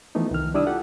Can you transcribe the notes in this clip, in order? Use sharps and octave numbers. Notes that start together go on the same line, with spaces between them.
E3 F3 A3 B3 D#4
C2 D#3 F6
G3 D4 E4 D5 D#6 E6
F4 G4 A4 F#5